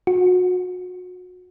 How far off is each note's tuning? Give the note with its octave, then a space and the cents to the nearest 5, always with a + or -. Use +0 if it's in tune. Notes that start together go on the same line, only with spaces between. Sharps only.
F#4 -35